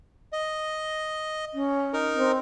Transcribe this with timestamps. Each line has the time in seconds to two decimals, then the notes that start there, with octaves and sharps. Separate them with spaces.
0.32 D#5
1.53 C#4
1.93 D#4 A#4
2.14 C4